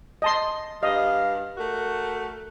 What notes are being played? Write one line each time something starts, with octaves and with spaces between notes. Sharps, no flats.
D#5 A5 C6
G2 D#5 F5
A3 F#4 A#4